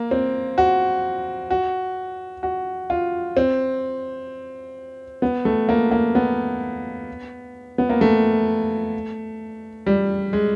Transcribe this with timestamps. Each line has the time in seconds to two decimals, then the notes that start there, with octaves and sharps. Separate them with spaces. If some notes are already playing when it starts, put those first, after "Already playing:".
Already playing: A#3
0.11 C4
0.58 F#4
1.50 F#4
2.43 F#4
2.90 F4
3.37 C4
5.22 B3
5.45 A3
5.69 A#3
5.91 A#3
6.15 B3
7.78 B3
7.90 A#3
8.01 A3
9.86 G3
10.33 G#3